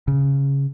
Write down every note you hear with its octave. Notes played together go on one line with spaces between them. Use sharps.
C#3